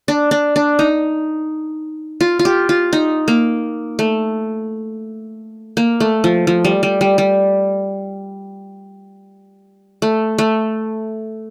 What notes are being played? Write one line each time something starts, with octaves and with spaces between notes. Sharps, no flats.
D4
D4
D4
D#4
F4
F4
G4
F4
D#4
A#3
A3
A#3
A3
F3
F3
G3
G3
G3
G3
A3
A3